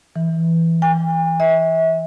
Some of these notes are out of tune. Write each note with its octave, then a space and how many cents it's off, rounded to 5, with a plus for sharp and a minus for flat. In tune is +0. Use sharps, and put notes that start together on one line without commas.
E3 +5
G#5 -45
E5 -35